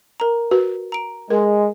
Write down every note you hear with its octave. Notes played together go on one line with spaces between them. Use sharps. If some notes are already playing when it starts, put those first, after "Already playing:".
A#4 A#5
F#4 B4
A#5 D7
G#3 A#4